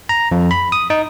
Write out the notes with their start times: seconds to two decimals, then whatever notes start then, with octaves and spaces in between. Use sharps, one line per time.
0.09 A#5
0.32 F2
0.51 B5
0.72 D#6
0.90 D#4